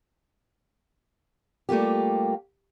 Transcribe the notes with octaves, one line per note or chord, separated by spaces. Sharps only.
G3 A3 A#3 F4 G4